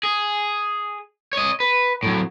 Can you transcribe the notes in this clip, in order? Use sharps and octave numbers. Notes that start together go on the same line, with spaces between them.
G#4
C#5 D#5
B4
A2 F#3